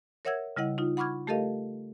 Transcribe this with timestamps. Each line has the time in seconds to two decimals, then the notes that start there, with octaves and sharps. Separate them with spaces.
0.25 A#4 C#5 E5 F#5 E6 G#6
0.56 C#3 G3 E4 D#5 F#5
0.78 D#4 F4
0.97 F#5 B5 C#6 D6 F6 G#6
1.27 A3 G4 A4 A#4 D#5 F5